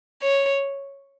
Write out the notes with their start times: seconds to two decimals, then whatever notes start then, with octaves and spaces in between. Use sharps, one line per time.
0.23 C#5